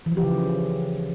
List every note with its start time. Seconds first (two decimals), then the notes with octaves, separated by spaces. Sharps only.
0.06 E3
0.12 F3
0.17 G4
0.22 C#3